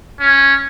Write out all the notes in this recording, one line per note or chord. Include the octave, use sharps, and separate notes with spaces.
C#4